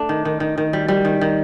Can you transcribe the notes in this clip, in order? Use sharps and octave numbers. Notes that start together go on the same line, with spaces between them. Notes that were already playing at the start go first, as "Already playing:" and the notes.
Already playing: A3 D4
D#3
D#3
D#3
D#3
G3
G3
D#3
D#3